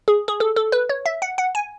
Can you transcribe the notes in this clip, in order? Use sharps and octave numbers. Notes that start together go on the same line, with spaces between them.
G#4
G#4
A4
A4
B4
C#5
E5
F#5
F#5
G#5